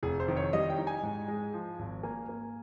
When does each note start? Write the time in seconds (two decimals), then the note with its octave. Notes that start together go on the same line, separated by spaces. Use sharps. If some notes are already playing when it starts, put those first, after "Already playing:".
0.03 F1 G#4
0.20 C5
0.28 D#3
0.36 C#5
0.53 G3 D#5
0.70 G5
0.78 D#4
0.87 G#5
1.03 G#2
1.28 G#3
1.53 F3
1.79 G#1
2.03 A#3 G#5
2.29 A#3